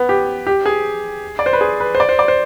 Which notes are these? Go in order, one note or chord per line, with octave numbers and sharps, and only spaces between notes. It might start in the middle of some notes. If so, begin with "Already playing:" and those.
Already playing: B3
G4
G4
G#4
D5
C5
B4
G#4
B4
C5
D5
C5
D5
C5